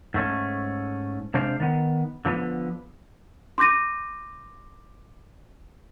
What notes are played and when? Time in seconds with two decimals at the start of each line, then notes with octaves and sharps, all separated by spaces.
0.14 G#2 A3 C#4
1.34 C3 G#3 D4 C5 F5
1.60 D#3 B3
2.25 D3 F3 A#3 B3
3.58 C6 D6 G6 A#6 D#7